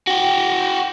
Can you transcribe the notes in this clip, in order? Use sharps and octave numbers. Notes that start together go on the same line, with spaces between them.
F#4 G5